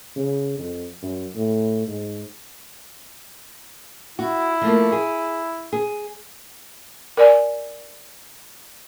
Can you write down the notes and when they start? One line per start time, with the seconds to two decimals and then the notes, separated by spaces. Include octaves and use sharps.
0.16 C#3
0.58 F2
1.02 F#2
1.35 A2
1.87 G#2
4.19 E4 F#4
4.61 F3 A3 A#3
4.92 G#4
5.73 G#4
7.17 A#4 D5 G#5